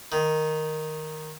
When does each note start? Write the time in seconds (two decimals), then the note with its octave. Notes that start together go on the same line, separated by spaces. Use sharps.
0.12 D#3